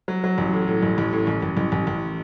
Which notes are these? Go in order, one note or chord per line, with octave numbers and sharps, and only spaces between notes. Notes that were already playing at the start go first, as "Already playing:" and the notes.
F#3
F#3
A1
A2
A2
A1
A1
A2
A1
A1
A1
A1
A1